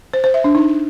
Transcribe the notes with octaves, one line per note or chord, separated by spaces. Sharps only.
C5
C5
E5
D4
D#4